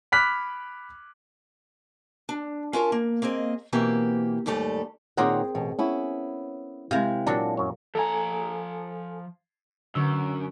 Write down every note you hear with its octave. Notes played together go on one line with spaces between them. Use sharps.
B5 D6 F6 F#6 B6
D4
C#4 F4 A#4 A5
A#3
A#3 C4 G#4 D#5
B2 E3 A#3 C4 G4
D#2 G#2 G3 A3 A4
A#2 D#3 C4 G#4 A#4 C#5 F#5
A1 B2
B3 C#4 E4
C3 G#3 E4 A#4 F5 A#5
A#2 F#3 D4
F#2 C#5
F3 A4 G#5 A#5
F#2 D3 C#5 E6